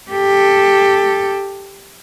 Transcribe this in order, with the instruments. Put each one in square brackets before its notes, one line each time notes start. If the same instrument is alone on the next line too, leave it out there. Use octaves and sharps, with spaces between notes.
[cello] G4 A4